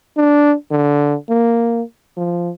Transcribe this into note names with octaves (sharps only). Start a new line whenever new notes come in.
D4
D3
A#3
F3